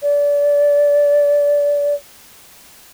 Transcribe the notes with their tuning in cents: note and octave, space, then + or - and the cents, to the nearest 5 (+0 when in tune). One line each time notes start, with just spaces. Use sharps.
D5 -25